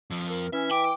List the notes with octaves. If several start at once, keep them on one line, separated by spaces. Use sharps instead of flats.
F2 F3
A#4
E3 C#4 E5
G5 D6